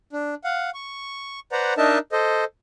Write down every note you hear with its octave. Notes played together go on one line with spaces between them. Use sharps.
D4
F5 F#5
C#6
B4 C5 D5 F#5 A#5
D4 D#4 A#4 D#5 E5 A5
A4 C5 D#5